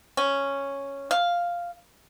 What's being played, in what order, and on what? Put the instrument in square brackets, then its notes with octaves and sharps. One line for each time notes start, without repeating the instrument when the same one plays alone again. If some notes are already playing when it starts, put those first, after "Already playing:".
[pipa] C#4
F5